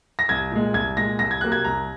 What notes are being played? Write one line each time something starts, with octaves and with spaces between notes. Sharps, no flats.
A#6
C2 G#6
A#2 G#3
C2 G#6
A#2 G#3 A#6
C2 A#6
G#6
C3 F#3 A#3 F#6
G#6
C2 A#5